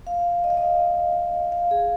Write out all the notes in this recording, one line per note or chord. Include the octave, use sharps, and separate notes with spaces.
F5
D#5
F5
D#5
F5
G#4